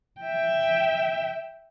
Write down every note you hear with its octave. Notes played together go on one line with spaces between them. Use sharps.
E5 G5